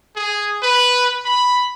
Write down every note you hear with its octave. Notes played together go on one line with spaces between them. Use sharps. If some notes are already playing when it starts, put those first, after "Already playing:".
G#4
B4
B5